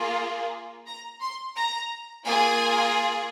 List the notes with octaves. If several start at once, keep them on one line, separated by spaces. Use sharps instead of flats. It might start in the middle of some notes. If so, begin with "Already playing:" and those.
Already playing: A#3 F4 G#4
A#5
C6
A#5
A#3 F4 G#4 G#5